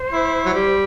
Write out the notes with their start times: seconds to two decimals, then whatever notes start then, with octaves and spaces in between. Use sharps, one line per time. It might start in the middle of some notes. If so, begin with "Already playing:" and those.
Already playing: C5
0.11 E4
0.46 F#3
0.53 G3